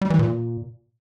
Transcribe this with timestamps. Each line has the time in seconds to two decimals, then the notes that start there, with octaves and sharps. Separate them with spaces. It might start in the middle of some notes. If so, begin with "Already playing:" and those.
0.02 G3
0.10 E3
0.19 A#2